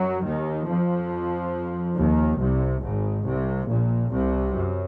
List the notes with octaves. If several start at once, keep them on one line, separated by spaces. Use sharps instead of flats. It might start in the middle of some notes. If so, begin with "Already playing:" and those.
Already playing: F#2 F#3
D#2 D#3
F2 F3
D#2 D#3
C2 C3
G#1 G#2
C2 C3
A#1 A#2
C2 C3
F#2